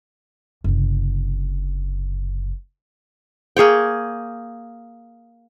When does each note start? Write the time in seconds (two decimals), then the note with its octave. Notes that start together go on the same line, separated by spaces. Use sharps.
0.64 F#1 C3
3.57 A#3 G#4 C#5 G5